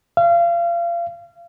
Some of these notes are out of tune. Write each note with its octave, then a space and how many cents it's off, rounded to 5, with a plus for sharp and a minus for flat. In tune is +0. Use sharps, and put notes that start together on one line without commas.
F5 -30